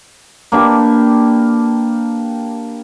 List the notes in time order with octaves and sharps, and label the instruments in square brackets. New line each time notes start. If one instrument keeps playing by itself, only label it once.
[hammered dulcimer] A#3 D4 G4 B4